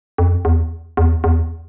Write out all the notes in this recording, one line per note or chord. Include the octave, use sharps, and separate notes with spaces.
F2
E2
E2
E2